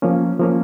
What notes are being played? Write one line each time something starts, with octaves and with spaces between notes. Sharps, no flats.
F3 A#3 C#4
F3 A#3 C#4